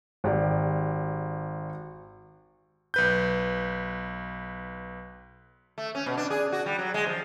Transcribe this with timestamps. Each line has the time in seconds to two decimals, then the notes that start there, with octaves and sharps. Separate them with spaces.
0.24 G#1 G4 D5
2.94 B1 B4 G6
5.78 A3
5.95 C#4
6.06 B2
6.18 D4
6.31 G#4
6.52 F#4
6.66 G3
6.79 F#3
6.94 G#3
7.06 F3